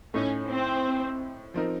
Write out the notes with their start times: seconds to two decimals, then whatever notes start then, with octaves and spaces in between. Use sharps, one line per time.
0.14 A2 A3 C#4 D#4
0.49 C4
1.54 F3 C4 D#4 A#4